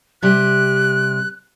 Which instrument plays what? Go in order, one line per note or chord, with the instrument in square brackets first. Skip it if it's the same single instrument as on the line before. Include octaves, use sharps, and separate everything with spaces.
[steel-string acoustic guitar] C3 G3 [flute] F#6